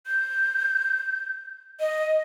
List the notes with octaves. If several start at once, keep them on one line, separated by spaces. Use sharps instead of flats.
G6
D#5